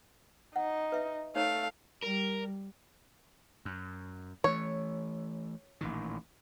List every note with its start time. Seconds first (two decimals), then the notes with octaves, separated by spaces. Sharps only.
0.56 D#4 F#5
0.92 B4 E5
1.36 A3 D#4 C#5 F5 A#5
2.04 G3 A#4
3.65 F#2
4.44 E3 A3 C#5
5.81 A1 A#2 D#3